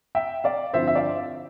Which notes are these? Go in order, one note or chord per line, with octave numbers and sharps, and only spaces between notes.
E5 G5
D5 F5
G2 D3 F3 C4 E4 C5 E5
E5
D5 F5